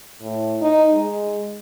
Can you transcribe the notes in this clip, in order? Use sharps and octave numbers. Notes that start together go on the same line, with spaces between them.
A2
D#4
G#3